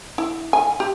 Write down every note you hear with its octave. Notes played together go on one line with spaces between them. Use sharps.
E4
G#5
G4